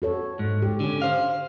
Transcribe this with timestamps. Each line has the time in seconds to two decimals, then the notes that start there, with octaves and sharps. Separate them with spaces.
0.02 F#4 A4 C#5
0.39 G#2
0.62 G4
0.80 D3 C#4
1.02 C5 F5